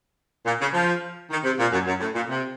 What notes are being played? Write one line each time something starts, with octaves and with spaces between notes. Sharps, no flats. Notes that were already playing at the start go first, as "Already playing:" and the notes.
A#2
C#3
F3
D#3
C3
A#2
F#2
F#2
A2
A#2
C3